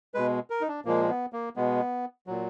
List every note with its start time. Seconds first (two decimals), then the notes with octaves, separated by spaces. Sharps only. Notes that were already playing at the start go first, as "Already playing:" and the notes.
0.14 B2 G#3 B4
0.50 A#4
0.61 D#4
0.68 D4
0.85 A#2 F3 G#3 A#3
1.09 B3
1.33 A#3
1.56 B2 G#3 B3
2.27 A#2 F#3